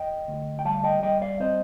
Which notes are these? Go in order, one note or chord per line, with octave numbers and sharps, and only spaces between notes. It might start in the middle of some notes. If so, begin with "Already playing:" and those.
Already playing: D#5 G5
D2
G5
G3 F5 A5
F5
D#5 G5
G3 D#5 G5
D5 F5
C4 C5 D#5